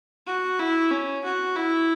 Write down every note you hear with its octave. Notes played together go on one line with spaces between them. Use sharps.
F#4
E4
C#4
F#4
E4